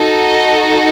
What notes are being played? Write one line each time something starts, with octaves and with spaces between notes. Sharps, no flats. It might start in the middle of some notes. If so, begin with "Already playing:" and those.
Already playing: D#4 F#4 A4
D#5